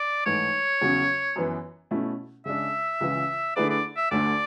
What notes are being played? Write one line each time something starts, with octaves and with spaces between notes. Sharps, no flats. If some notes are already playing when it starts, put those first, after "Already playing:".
Already playing: D5
G#2 E3 A3 C#5
E2 C#3 F#3 C#4
F#2 E3 B3
B2 A3 C#4 E4
C#3 G#3 D4 E5
C#2 C#3 E3
D3 A3 E4 G#4 B4 D5
D5
E5
D2 D3 A3 D4 D5